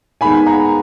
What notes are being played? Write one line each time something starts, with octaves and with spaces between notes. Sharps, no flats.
D#2 D#3 G#3 B3 G#5 B5
F#5 A#5